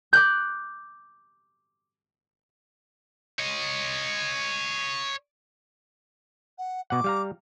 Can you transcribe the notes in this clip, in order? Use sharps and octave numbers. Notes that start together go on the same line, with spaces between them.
D6 F#6 G6
C#5 D#5
F#5
B2 F#5 D6
G3 F5 A#5